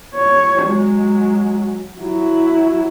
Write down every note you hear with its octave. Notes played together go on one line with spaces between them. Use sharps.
C#5
F#3 G#3
F#3 E4